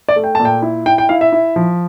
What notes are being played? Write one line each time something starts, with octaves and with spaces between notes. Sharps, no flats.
D5
A3
G5
A#2 A5
G5
E4
E4 G5
G5
E4 F5
E5
E4
F3